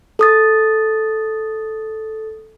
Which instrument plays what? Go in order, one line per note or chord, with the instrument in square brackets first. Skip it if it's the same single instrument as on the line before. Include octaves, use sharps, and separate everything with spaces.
[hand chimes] A4 D#6 A6